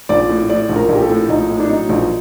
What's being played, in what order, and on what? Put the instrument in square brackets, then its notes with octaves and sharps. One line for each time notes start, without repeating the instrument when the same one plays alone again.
[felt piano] A#1 D5
A2
A2 D5
A#1
A#4
A#1
G4
A4
A2
A#1 D#4
A2
D4
F#3 D#4
A#1